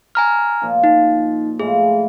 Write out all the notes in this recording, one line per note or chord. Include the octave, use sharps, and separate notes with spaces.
G#5 A#5 F6
A#2 F3 F4
D#4
A2 G#3 F4 G#4